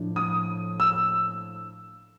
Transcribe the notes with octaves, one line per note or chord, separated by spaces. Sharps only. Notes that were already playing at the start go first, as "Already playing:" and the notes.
Already playing: A2 F3 A3 D4
D#6
E6